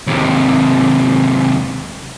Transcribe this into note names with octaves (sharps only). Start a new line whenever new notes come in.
D#2 C3